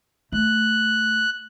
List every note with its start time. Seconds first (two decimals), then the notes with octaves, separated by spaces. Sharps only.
0.32 A3 F#6